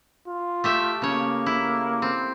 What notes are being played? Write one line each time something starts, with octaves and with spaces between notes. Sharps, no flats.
F4
A3 G4 E5
C#3 A#3 C#5
E4
C4